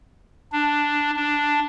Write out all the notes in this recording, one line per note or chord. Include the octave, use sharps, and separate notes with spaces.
D4
D4